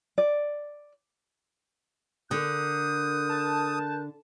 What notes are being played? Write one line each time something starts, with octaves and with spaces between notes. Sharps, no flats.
D5
D3 A#4 D#6 F#6 G6
A5